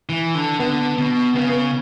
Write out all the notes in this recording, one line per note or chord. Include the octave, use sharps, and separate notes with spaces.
E3
D3
D3 B3
B2
C#3 B3
B3